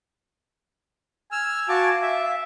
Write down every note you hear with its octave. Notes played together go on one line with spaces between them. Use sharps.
G#5 E6 F6
F#4 F5 A5 D6
E5